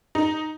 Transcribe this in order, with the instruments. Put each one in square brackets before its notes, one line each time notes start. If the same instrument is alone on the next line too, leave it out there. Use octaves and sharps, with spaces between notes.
[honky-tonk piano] D#4